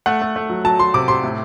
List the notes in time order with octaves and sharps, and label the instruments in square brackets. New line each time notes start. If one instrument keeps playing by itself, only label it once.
[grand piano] A3 F#5
A3
A3
F#3
F#3 A5
F#3 C6
C3 D6
C3 C6
A2